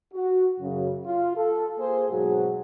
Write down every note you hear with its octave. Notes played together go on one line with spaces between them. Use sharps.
F#4
F#2 C#3
F4
A4
A#3 G#4 C5
G#2 B2 F#3 F#4 G#4